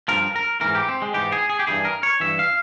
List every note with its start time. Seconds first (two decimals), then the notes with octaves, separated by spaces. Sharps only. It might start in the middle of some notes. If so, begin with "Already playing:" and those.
0.08 G2 F3 A#4
0.36 A#4
0.61 G#2 E3 A#4
0.75 G4
0.89 C4
1.02 G#3
1.14 G#2 E3 G4
1.32 G#4
1.50 G#4
1.59 G4
1.67 G2 E3 G#4
1.85 A#4
2.03 C#5
2.20 G2 E3 E5
2.39 F5